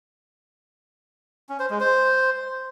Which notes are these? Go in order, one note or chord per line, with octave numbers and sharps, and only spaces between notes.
C#4
C5
G#3
C5